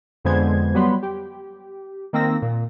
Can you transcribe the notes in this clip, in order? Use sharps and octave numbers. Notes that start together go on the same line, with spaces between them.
F2 D3 G#3 B3 C5 G#6
F#3 G3 B3 B5 C6
G4
D#3 A#3 C4 E6 A#6
A#2